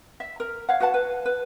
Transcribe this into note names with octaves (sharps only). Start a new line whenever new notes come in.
E5
A#4
C#5 F5 F#5
F#4 B4 F#5 A5
B4
B4